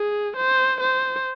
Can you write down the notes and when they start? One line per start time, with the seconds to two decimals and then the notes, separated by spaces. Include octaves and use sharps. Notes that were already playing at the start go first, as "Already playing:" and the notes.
Already playing: G#4
0.36 C5
0.81 C5